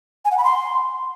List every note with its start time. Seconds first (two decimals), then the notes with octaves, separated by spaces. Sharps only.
0.25 G#5
0.31 F#5
0.38 B5
0.44 C6